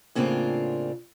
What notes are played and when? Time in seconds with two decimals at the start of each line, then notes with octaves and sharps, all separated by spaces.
0.15 A2 C#3 A#3 C4 D4 F4